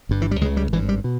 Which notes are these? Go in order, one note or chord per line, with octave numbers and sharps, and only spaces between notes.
G1 G2
E3
G3
C#2 C#3 G#3
G3
G#1 G2 E3
G3
B2